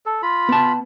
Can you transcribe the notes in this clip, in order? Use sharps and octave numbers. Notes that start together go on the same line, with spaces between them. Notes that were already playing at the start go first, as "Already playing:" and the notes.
A4
F4 B5
B3 A5